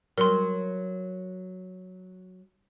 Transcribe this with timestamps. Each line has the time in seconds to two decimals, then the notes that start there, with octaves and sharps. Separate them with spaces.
0.18 F#3 A#4 C6